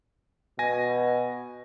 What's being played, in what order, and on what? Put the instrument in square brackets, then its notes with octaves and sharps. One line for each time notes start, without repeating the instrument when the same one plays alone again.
[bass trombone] B2 [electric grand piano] G#5 A#6